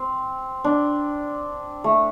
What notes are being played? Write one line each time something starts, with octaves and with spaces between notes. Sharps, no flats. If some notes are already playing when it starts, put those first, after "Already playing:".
Already playing: C4
D4
A3